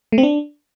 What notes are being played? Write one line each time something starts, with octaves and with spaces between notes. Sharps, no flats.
A3
C4
D4